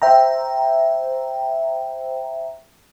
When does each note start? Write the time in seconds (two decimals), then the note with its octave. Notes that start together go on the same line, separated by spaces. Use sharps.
0.02 C5 E5 G5 A#5